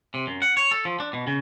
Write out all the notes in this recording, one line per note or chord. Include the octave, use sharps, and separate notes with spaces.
C3
F#2
F#5
C#5
A4
F3
D4
B2
C#3